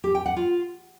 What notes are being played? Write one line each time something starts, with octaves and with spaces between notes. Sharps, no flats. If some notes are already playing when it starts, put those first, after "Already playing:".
G4
G5
F#5
F4